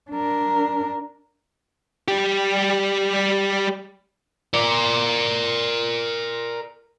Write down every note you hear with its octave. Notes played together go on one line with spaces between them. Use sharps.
D4 A#4
G3 G4
A#4 D5